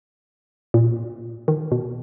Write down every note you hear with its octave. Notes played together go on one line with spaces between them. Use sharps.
A#2
D#3
B2